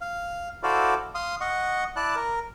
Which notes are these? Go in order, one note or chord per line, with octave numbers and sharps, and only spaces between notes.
F5
E4 F#4 A4 C5 D5 F5
F5 C6 D#6
D#5 F#5 C#6
E4 D5 A5 F#6
A#4